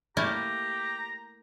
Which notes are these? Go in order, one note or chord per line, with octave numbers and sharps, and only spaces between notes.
A3 A#3 E4 G4 A#5